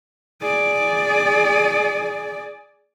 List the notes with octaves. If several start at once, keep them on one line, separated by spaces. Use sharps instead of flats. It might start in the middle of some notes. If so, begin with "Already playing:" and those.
G#4 D5